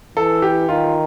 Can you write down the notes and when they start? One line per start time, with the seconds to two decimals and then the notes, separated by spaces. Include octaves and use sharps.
0.17 E3 A4
0.42 G4
0.68 D#3 F4